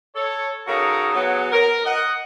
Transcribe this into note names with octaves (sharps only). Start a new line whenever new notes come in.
A4 C#5
C#3 D#4 F#4 A4 A#4 A#5
F#3 B3 G#4
A#4
D#5 F#5